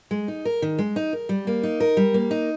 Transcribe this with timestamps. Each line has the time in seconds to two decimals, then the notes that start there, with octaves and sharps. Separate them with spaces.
0.11 G#3
0.28 D#4
0.45 A#4
0.62 D#3
0.79 G#3
0.96 D#4
1.13 A#4
1.29 G3
1.47 A#3
1.63 D#4
1.80 A#4
1.97 G3
2.14 A#3
2.31 D#4